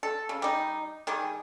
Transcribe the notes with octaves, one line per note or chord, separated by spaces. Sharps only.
A4
C#3
G3 D#4
D#3 G3 G#4